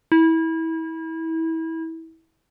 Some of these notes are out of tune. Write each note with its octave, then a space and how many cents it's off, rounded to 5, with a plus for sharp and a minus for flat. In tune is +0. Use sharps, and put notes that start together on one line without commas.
E4 -25